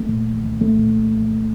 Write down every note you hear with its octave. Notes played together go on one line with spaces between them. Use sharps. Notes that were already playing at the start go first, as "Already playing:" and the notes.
Already playing: A3
A#2
C2
C2
A3
A#2